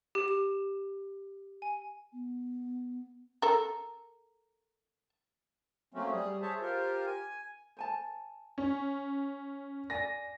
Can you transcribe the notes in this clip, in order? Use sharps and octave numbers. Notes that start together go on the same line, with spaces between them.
G4
E7
G#5
B3
A4 A#4
F#3 A3 A#3 C4 C#4
G3 G#4
G#4 C5 C#5 E5 A5
F4 G4 A#4 C5
G#5
C5 G#5 A5
C#4
D5 G#5 A#6